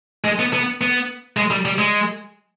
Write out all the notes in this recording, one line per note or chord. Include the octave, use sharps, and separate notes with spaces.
G#3
B3
B3
B3
G#3
G3
G3
G#3